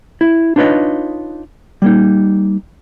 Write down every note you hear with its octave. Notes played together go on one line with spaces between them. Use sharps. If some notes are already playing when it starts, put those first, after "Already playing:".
E4
D4 D#4 F4 B4 C#5 D#5
G3 A#3 D#4